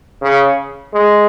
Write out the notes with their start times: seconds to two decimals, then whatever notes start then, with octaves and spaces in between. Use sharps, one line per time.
0.22 C#3
0.94 G#3